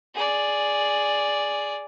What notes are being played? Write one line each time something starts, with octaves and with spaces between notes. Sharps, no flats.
G#4 D5